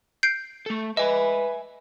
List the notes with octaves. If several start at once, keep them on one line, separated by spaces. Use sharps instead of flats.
G6 C7 D7
A3 A4
G#3 B4 D#5 E5 G#5